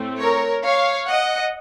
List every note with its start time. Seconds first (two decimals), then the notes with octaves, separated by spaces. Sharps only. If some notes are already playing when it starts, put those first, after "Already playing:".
Already playing: A2 A3 C4
0.19 A#4 C#5
0.64 C#5 F5
1.08 D#5 F#5